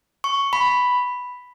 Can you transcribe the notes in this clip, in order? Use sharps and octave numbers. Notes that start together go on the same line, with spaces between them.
C#6
B5